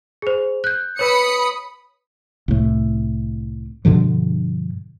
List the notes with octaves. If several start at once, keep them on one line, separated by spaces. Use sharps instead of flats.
G#4 C5
F#6 G6
B4 C#5 B5 D#6 C#7
C2 A2
G2 B2 D3 F3